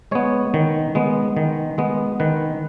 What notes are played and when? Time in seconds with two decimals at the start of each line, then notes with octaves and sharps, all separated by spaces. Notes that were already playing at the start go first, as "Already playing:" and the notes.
0.11 G#3 B3 C#5
0.54 D#3
0.95 G#3 B3
1.37 D#3
1.78 G#3 B3
2.20 D#3 B4